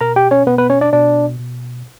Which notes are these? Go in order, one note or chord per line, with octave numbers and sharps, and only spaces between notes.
B2 A#4 A#5
G4 G5
C#4 C#5
B2 B3 B4
B3 B4
C#4 C#5
D4 D5
B2 D4 D5
B2